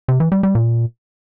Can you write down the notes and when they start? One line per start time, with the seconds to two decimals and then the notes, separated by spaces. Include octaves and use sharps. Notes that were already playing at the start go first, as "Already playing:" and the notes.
0.08 C3
0.20 E3
0.32 G3
0.43 G3
0.55 A#2